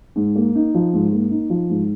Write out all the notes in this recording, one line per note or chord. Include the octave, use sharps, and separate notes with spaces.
G#2
A#3
D#4
F3
G#2
A#3
D#4
F3
G#2